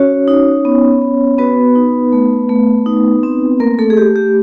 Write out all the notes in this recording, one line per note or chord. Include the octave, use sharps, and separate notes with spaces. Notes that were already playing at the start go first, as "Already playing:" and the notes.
Already playing: C#4 F#4 C#5
D#4
B3
B3
B3 F#4 B4
D#4
A3
A3
D#4
C4
A3 A#3 A#4
A3 A4
G#4
A3 G4
G4